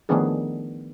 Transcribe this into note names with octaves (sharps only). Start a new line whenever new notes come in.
D#3 F3 A3 B3 D4 G#4